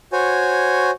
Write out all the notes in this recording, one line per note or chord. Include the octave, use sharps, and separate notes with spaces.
F#4 C5 C#5 G#5